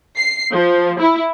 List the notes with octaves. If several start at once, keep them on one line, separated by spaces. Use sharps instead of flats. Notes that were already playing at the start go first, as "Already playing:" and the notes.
C7
F3
E4